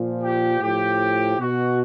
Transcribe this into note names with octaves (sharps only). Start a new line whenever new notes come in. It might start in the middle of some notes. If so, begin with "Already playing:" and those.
Already playing: A#2 F3
G4
A2 F3 G4
B2 F#4